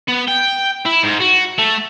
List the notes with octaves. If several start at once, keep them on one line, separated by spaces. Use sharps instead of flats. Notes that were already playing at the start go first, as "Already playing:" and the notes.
B3
G5
E4
G#2
F#4
A3